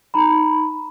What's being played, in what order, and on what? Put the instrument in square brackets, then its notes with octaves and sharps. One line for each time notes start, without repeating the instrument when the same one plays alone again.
[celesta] D#4 A#5 B5